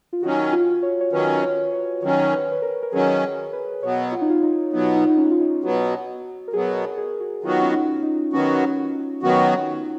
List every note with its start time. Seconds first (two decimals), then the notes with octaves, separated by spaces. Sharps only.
0.13 F4
0.23 D#3 F#3 C#4 F#4
0.53 F4
0.83 C#5
1.01 C#5
1.13 D#3 F#3 C#4 B4
1.42 C#5
1.73 C#5
2.03 D#3 F#3 C#4 C#5
2.28 C#5
2.33 B4
2.52 B4
2.62 A#4
2.83 A#4
2.92 D#3 F#3 C#4 G#4
3.23 A#4
3.53 B4
3.83 B2 F#3 B3 C#5
4.12 F4
4.22 D#4
4.30 F4
4.43 D#4
4.73 B2 F#3 B3 D#4
4.96 D#4
5.10 D#4
5.18 C#4
5.31 F4
5.41 D#4
5.63 B2 F#3 B3 F#4
6.48 A#4
6.53 B2 F#3 B3 G#4
6.98 G#4
7.20 F#4
7.43 D#3 F#3 B3 F4 F#4
7.63 C#4
7.72 D#4
8.03 D#4
8.33 D#3 F#3 B3 C#4 F#4
9.23 D#3 F#3 B3 F#4